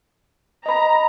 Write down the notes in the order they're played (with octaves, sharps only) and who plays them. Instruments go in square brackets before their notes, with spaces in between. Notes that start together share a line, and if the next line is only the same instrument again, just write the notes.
[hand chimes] D#5 B5 [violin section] A#5